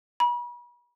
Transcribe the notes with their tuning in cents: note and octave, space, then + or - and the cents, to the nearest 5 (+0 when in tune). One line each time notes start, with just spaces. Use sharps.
B5 -40